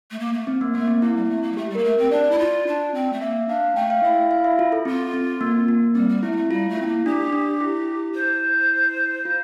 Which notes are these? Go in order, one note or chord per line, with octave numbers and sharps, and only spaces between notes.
A3
A#3
A3
C4
A#3
A3 A#3
C4
A#3 E4
G3
A#3
A3
A#3
G3
A3 G4
G3
A#3 A#4
A3
C4
D4 D5
E4
F4
D4
C4
A3
A#3 E5
D4 F5
A3 G5
F5
E4 E5
F5
E5
F4
A4
C4 F4
C4
A#3
A#3
G3 C4
G3
A3 E4
G3
A3
G3 F4
A3
C4 E4
A#3
D4 G4
D4
E4
C5
F4